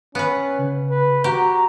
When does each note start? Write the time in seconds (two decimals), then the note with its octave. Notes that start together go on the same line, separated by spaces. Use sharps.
0.15 B3 C#4 B4
0.58 C#3
0.91 B4
1.24 F#4 G4 A#5